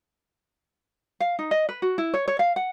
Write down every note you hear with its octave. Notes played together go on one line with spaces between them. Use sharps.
F5
D#4
D#5
B4
F#4
E4
C#5
C#5
F5
F#5